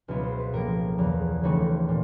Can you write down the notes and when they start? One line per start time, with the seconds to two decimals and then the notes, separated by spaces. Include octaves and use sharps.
0.08 C#2 B2 F#3 B3 E4 F5
0.23 C5
0.38 B4
0.53 A2 F3 A#3 A#4
0.98 E2 C#3 F3 A#3
1.44 D#2 C#3 E3 A3 C4
1.89 A#2